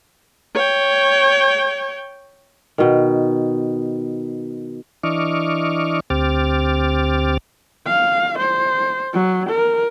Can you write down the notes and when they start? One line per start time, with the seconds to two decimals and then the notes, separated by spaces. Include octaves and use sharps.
0.55 C#5 G5
2.78 B2 D#3
5.03 E3 D4 D#5 C#6 D6 F6
6.10 D2 C4 G4 D6 F6 A6
7.87 F5
8.39 C5
9.14 F#3
9.50 A#4